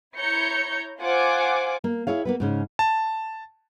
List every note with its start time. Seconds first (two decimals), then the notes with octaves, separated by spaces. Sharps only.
0.17 E4 C#5 A#5 G6 C#7
0.99 F4 C5 F#5 G#5 D6
1.84 A#3
2.07 E4 G#4 C#5 F5
2.25 A#3 B3 B4
2.40 G#2 C#3 C#4
2.79 A5